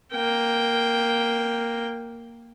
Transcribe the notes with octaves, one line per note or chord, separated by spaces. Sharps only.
A#3 G5